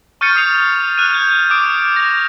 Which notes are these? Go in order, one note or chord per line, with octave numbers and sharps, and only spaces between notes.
C#6 F6 G6 A6 C#7 D#7
D#6 C7 F7
F6 F#6 D#7
G6 G#6
D6 D#6 D7
A#6 F7